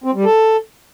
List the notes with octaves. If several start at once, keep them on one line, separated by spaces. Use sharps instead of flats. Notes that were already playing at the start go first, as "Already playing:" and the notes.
C4
G3
A4